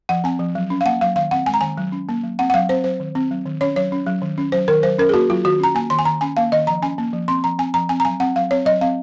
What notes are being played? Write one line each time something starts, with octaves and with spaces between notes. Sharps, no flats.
F3 F#5
C4 G#5
F3
F#3
C#4
F5
A#3 F#5
F#3 F5
D#3 F5
C4 F#5
G#3 G#5
A#5
D#3 G#5
F#3
C#4
A#3
F#3
C4 F#5
F#5
F#3 F5
C4 C5
F#3 C5
D#3
C4
F#3
D#3
C#4 C#5
F#3 C#5
C#4
F#3
D#3
C#4
F#3 C5
D#3 A#4
F#3 C5
C#4 A#4
G#4
A#3 F#4
F#3 F4
D#3 F#4
C#4 A#5
A#3 G#5
D#3 C6
G#5
D#3 A#5
C#4 G#5
A#3 F5
D#3 D#5
F3 A#5
C#4 G#5
A#3
F3
C4 C6
F3 A#5
C4 G#5
F3 A#5
C4 G#5
A#5
F#3 G#5
C4 F#5
F#3 F5
C4 C#5
F#3 D#5
C4 F5